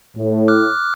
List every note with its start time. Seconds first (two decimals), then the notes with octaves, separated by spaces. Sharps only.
0.16 A2
0.48 D6 F6 F#6